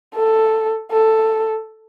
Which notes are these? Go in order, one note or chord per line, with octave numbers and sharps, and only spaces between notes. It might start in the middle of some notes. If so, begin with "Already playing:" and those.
A4
A4